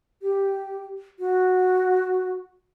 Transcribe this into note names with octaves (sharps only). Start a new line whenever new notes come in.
G4
F#4